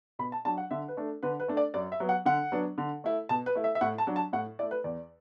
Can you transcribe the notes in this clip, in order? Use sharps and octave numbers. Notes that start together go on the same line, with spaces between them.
B2 B5
A5
F#3 D4 A5
F#5
D3 E5
B4
A3 D4
D3 B4
B4
A3 D4
D5
F#2 D5
E5
F#3 B3
F#5
D3 F#5
F#3 B3 D4
D3
A3 E4
B2 A5
B4
A3 E4
E5
E5
A2 F#5
A5
F#3 D4
A5
A2 F#5
A3 E4 D5
B4
E2 D5